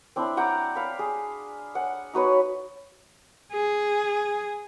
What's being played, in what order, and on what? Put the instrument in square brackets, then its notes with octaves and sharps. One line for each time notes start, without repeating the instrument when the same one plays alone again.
[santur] C4 D4 E4
F#5 G5 A#5 D6
F5 B5
G#4
F#5 G#5
D#4 F#4 B4 C#5
[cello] G#4